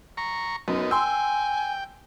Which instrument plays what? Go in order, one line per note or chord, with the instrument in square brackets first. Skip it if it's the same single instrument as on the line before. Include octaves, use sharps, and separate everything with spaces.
[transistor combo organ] A#5 C#6
[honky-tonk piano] F#2 [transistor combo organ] B3 D#4
[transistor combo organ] G5 [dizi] G#5 [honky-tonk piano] C6 E6